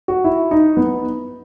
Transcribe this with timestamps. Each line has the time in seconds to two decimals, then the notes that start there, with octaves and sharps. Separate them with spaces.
0.08 F#4
0.24 E4
0.51 D#4
0.77 B3